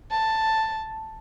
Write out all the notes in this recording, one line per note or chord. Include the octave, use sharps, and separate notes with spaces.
A5